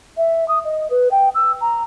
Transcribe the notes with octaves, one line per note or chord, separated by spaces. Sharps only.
E5
D#6
D#5
B4
G5
E6
A#5